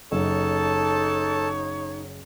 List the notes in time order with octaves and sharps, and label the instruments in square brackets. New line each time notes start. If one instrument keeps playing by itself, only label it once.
[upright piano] F#1 [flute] D#4 [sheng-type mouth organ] A4 A5 [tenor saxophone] C#5